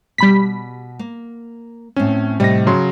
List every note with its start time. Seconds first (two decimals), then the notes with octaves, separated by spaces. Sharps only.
0.18 B2 G3 B5 B6
0.99 A#3
1.96 A2 C4 C#4
2.40 A2 C3 G3 D#5 A#6
2.66 C#3 F#3 C6